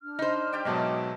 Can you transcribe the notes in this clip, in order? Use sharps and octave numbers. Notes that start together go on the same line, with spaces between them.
D4 F6
D#4 C5
G4 D5 G5
G#2 B2 F#3 D#5 E5 A5